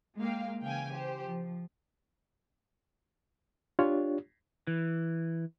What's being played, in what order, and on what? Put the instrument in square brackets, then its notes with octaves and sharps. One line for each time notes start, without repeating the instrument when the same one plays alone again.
[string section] G#3 A#3 F5 G5
C#3 E3 F5 G5 G#5
G4 C5
F3
[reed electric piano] D4 F4 G4 C#5
[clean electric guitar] E3